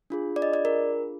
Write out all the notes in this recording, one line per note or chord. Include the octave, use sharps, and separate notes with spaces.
D4 F4 G#4
D5
D#5
D5
A#4